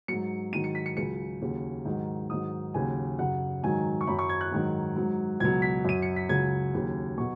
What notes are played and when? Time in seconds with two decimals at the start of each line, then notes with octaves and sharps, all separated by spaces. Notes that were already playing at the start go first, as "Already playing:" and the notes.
0.08 G#2 F#3 C#7
0.52 G#2 D#3 F#3 D#7
0.64 C#7
0.75 B6
0.86 C#7
0.97 C#2 C#3 F#3 C#7
1.42 D#2 C#3 F#3
1.85 G#2 D#3 F#3
2.30 G#2 D#3 F#3 D#6
2.74 D#2 C#3 F#3 G#5
3.19 F#2 C#3 F#3 F#5
3.63 G#2 D#3 F#3 G#5
4.01 C#6
4.07 F#2 F#3 B5
4.19 C#6
4.29 G#6
4.41 F#6
4.52 G#2 D#3 F#3
4.96 G#2 F#3
5.40 C#2 B2 F#3 G#6
5.62 B6
5.85 F#2 F#3 D#7
6.02 C#7
6.16 B6
6.29 C#2 C#3 F#3 G#6
6.74 D#2 C#3 F#3
7.18 B2 F#3 C#6